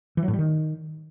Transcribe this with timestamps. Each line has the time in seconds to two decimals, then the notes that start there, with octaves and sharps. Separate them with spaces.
0.17 E3
0.23 F#3
0.28 A2
0.33 G3
0.39 D#3